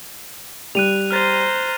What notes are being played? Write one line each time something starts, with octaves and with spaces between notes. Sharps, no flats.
G3 F#6 D#7 F7
C5 A#5 F6 A6